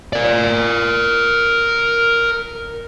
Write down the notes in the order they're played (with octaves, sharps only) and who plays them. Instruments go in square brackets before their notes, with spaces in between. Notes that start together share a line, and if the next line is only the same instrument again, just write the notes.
[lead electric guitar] A#4 D5